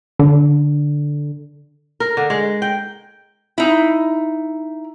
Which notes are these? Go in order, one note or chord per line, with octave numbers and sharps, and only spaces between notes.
D3
A#4
D3
G#3
G5
D#4 E4